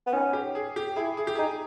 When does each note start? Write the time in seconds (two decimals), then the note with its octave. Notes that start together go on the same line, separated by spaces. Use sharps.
0.07 B3
0.13 C#4 D#4
0.33 G4
0.55 G#4
0.76 G4
0.96 E4 G#4
1.17 G#4
1.27 G4
1.35 D#4 G#4